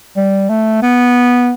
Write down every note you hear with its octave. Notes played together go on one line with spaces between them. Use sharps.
G3
A3
B3